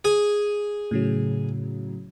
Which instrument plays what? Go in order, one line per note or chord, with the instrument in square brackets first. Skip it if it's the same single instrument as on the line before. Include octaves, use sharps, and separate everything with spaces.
[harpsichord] G#4 G#5
[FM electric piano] A2 C#3 F#3